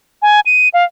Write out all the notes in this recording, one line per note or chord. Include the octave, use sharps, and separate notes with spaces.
G#5
D#7
F5